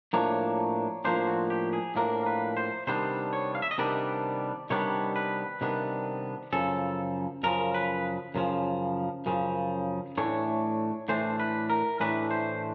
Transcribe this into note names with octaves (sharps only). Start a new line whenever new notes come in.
A2 F3 A#3 D4 C#5
A2 F3 A#3 D4 C5
F#4
G4
G#4
A2 F3 A#3 D4 A#4
B4
C5
C3 D#3 G3 B3 D4 C5
C#5
F5
E5
D#5
C3 D#3 G3 B3 D4 D5
C3 D#3 G3 B3 D4 C#5
B4
C3 D#3 G3 B3 D4
F#2 C#3 F3 A4
F#2 C#3 F3 A#4
B4
F#2 C#3 F3
F#2 C#3 F3
A2 E3 A3 D4 C#5
A2 E3 A3 D4 C5
B4
A#4
A2 E3 A3 D4 B4
C5